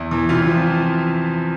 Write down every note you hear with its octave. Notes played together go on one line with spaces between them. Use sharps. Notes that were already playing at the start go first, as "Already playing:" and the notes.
Already playing: E2
E3
C3 F4
F3